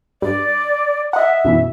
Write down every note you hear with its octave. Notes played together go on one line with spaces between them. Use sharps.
G2 D5
D#5 E5 F#5
F#2 B2 E3